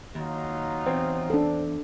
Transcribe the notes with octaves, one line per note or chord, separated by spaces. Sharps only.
D#2 F#3 D#4 F4
E2 C4
D4 A4